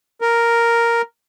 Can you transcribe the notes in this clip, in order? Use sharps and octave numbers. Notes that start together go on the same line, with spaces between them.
A#4